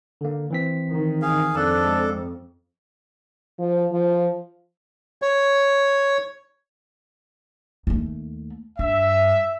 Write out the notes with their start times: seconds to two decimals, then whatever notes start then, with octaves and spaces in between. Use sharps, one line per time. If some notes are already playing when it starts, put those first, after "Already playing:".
0.21 D3 A#3
0.50 E3 C4 B6
0.90 D#3
1.22 G#4 F5
1.56 F2 D4 A4 A5 F#6
1.85 G#3
3.59 F3
3.92 F3
5.22 C#5
7.87 D#2 A3
8.79 G2 E5